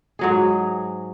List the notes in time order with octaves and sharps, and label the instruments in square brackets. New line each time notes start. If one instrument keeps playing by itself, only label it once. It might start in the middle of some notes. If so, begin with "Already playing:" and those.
[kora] G#2 F#3 G#4